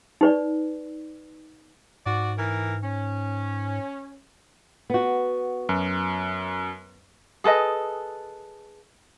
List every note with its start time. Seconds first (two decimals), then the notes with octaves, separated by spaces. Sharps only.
0.21 D#4 B4 D5
2.06 G#2 F#4 D5
2.38 E3 A#4
2.83 C#4
4.90 B3 F#4
5.69 F#2
7.44 G#4 A4 B4 D#5